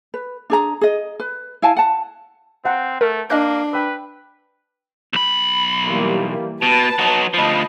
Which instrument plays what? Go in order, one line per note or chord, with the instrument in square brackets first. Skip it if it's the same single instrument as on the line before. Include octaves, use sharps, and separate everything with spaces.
[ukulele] B4
D4 G#4 A#5
G#4 D#5
B4
E4 F5 G#5 A5
F#5 A5
[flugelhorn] C4 [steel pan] F5 F#5 A#5
[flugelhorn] A3 [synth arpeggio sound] A#4
[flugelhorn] A#3 [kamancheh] D4 [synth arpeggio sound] D#5 F#6
[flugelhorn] B4 [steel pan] G5 E6
[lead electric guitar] B1 B5
[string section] E3 G3 A#3
[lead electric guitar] B2 [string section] B4 A5
[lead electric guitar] F#3 D#4
[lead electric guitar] D2 F3 [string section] D#5 A5 B5